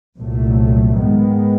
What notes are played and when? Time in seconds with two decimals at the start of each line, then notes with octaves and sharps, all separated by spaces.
0.18 C2 A#2 F#3 A3
0.97 G#2 D#3 G#3 B3